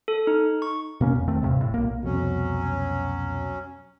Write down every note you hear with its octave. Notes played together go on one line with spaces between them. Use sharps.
A4
D#4
C#6
B2 A#3 C#4
E2
D#2 D#3 A3 C4
D#1 A#1 G2 C3
A2
B1 A#3
C2 F2 B2 F#3 C#4